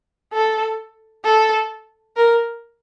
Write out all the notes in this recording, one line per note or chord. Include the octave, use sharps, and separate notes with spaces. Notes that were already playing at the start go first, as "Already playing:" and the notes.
A4
A4
A#4